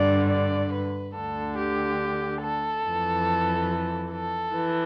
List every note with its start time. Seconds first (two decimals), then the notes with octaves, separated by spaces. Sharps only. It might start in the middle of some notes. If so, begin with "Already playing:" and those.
Already playing: G2 D3 D5
0.29 D5
0.72 B4
1.15 D2 D3 A4
1.57 G4
2.42 A4
2.85 F2 E3
4.12 A4
4.54 E3